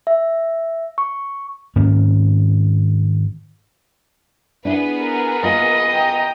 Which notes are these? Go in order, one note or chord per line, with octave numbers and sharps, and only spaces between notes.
E5
C#6
G#2 D#3 A#3 C#4
B3 D4 E4 G#4 B4
A#4
A#3 F4 D#5
G5 A#5